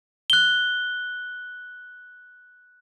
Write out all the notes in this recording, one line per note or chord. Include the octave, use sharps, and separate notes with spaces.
F#6 G7